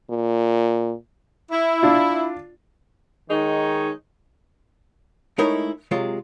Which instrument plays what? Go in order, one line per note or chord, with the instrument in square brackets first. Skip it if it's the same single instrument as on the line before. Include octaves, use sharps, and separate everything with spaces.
[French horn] A#2
[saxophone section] E4
[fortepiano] D4 F4
[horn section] D#3 G#3 D#4 C#5
[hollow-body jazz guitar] G#3 A3 D#4 E4 A#4 C#5
C3 F#3 G#3 F4